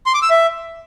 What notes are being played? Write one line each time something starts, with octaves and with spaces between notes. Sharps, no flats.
C6
D6
E6
E5